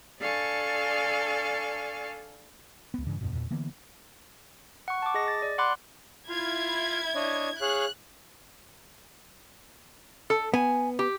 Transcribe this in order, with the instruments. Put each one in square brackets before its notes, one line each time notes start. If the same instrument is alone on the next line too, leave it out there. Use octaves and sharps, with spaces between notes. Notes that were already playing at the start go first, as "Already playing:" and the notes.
[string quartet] D4 A4 D5 F5 G#5 C#6
[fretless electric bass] C#2 B3
G2 C#3 E3
E2 G2 B2
E2 A#2
D3 E3 A#3 B3
[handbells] F#5 C#6
A5 D6
G#4 D#5 A#6
A6
D5
F#5 B5 C6 D6 F#6
[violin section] E4 G#6 [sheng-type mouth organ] F4 F5
[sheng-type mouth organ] D4 C#5 D#5
[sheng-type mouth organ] G#4 C#5 F5 [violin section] F#6
[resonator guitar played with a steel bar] A4
[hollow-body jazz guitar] B3 [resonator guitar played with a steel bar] G#5
[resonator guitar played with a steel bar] G4